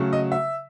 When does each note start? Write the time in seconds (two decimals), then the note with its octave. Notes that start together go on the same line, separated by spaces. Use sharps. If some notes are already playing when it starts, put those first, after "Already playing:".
Already playing: C#3 F#3 A3
0.13 D#5
0.32 E5